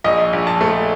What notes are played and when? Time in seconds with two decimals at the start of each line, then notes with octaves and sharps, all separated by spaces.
0.04 A#1 D#5
0.33 A#1
0.47 A5
0.61 A3